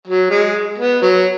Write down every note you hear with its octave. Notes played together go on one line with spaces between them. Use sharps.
F#3
G#3
B3
F#3